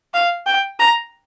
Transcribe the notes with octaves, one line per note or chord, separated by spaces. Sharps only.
F5
G5
A#5